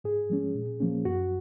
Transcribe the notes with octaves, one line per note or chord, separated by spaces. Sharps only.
G#2 G#4
F3 G#3 C#4
A#2
F3 A#3 C#4
F#2 F#4